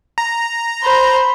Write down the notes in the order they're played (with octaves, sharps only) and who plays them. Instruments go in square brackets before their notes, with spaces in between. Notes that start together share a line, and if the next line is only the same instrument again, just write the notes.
[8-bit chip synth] A#5
[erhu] C5 [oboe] B5